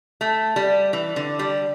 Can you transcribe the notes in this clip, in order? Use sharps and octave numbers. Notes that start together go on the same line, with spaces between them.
A3
G3
E3
D3
G3